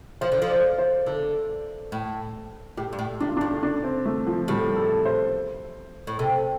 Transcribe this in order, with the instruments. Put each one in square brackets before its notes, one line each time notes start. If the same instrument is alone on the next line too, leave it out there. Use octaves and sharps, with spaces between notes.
[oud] F3 [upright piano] C5
[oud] D3
F3
[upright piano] D5
C5
[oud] D3 [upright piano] A4
[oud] A2
[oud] A2 [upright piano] G4
[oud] G2
A2
[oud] A2 [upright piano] D4
[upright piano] F4
[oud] A2 [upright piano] D4
[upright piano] D4
C4
A3
F3
[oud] A2 [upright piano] G3
[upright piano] A4
C5
[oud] A2
[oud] C3 [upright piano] A4